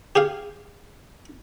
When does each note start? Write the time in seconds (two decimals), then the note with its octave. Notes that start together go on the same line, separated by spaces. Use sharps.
0.16 G4 G#4 F5